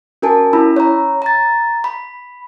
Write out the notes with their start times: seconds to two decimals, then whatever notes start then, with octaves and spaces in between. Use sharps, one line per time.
0.22 C#4 F#4 A#4 G#5 A5
0.53 C#4 E4 B5 E6
0.76 C#5 A#5
1.22 A#5 A6
1.84 B5